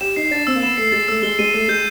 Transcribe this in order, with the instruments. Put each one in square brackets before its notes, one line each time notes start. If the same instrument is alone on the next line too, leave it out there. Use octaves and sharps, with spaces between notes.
[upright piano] G4 [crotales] E7
[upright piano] D#4 [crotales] C7
[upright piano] D4 [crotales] A6
[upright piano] C4 [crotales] E6
[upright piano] A#3
[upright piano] B3 [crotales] E7
[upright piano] A3 [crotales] C7
[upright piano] G#3 [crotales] A6
[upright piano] A3 [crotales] E6
[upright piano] G#3 [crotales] G7
[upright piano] G#3 [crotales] D#7
[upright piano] A3 [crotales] C7
[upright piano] G#3 [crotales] G6